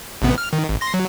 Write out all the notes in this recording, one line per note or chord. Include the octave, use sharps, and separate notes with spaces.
A1 C3 B3
F6
D#3
G#1
C6 A#6
F#3